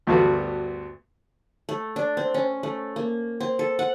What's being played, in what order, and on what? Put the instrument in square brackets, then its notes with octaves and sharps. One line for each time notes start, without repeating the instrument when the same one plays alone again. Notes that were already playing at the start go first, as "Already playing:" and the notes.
[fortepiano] D2 G2 A3 B3 F#4 F5
[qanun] A3
D4
C4
C#4
A3
A#3
C4
A4
F#5